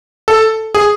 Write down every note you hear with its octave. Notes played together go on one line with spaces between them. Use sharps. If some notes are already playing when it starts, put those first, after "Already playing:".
A4
G#4